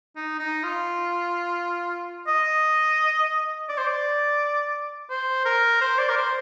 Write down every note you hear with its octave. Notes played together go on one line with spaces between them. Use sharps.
D#4
D#4
F4
D#5
D5
C5
D5
C5
A#4
C5
D5
A#4
C5